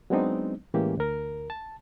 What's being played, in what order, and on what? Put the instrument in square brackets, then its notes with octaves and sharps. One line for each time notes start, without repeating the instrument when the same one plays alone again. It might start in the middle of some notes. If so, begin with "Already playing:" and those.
[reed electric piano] F#3 G#3 B3 C4 D4 D#4
A2 E3 G#3 A#3 C#4 G4
D2 A#4
A5